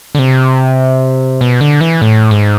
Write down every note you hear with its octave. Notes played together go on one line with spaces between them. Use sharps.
D3
C3
B2
D3
E3
A2
G#2